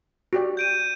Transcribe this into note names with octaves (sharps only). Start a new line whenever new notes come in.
F#4 G4 D5
G6 D7 D#7